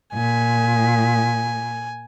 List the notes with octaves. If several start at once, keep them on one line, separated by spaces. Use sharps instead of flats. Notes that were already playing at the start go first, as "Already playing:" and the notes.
A#2 G#5